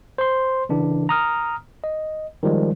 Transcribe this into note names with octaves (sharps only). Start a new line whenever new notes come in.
C5 C6
C#3 E3 D4
A#5 D#6 F6
D#5
D#3 F3 G3 G#3